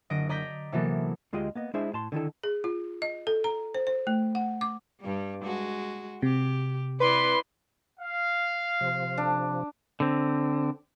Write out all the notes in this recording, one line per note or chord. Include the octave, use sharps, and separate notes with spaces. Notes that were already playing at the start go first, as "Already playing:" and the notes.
F#1 D3 D#5 A#6 D7
D5 D#5 A#5 G6 A#6 B6
C3 E3 F#3 A#3 B3 A4
D2 G#3 F4 G4 G#4 D#5
A#3 B3 D#5
G#3 D4 E4 G#4 C5 E5
A2 A5 C6
D3 D#3 E4 A4
G#4
F4
D#5
A4
A#5
C5
C5
A3
F#5
D6
G2 G3
G#3 F#4
C3 G4
E4 B4 D5 C6
F5
C3 F3
D4
D3 C4